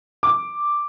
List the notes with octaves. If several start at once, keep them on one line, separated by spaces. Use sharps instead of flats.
D6